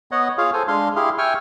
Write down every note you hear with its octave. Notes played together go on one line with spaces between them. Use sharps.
B3 C#5 D#5 F#5
F4 G#4 C#5 F5
A4 C5 G#5
G#3 D4 F5 C6
E4 G4 G#4 F5 C6
E5 G5 G#5 C#6 F6